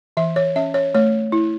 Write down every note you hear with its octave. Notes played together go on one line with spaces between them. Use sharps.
E3 E5
C#5
C#4 E5
C#5
A3 C#5
E4